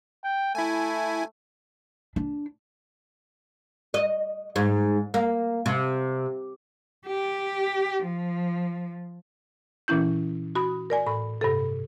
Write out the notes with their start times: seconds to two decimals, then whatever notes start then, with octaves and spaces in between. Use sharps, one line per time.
0.24 G5
0.55 A3 E4 G#5
2.16 D4
3.94 D#5
4.56 G#2
5.14 A#3
5.66 C3
7.07 G4
8.04 F3
9.88 A#2 E3 C#4 E4 G6
10.55 F#4 B5 D#6
10.90 A#4 D5 G#5
11.06 A2 B5
11.41 G2 C3 A4